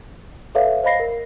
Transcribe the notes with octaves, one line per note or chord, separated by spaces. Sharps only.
A4 B4 C#5 E5 F5
C5 D#5 F5 B5 A#6 C7
A#4